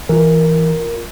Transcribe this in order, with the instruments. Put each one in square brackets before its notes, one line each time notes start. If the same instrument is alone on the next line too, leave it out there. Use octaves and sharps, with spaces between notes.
[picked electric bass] E3 [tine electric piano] F4 A#4